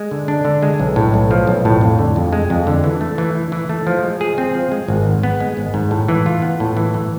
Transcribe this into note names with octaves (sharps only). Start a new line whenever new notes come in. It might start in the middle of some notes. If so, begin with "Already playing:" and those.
Already playing: G#3
D3
D4
D3
G#3
B1
A2
B1
F3
B1
A2
F2
D3
F2
G#3
F2
D3
E3
A3
E3
E4
E3
A3
F3
G#3
G#4
C4
F3
G#3
G#1
G#2
B3
G#3
G#1
G#2
A2
E3
F4
B3
A2
E3
E3